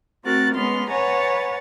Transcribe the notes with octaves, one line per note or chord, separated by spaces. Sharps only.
A3 C4 F#4 A#4 F#6 A6
G#3 B3 C#4 C6 F6
B4 C#5 F#5 G#5 A#5 A6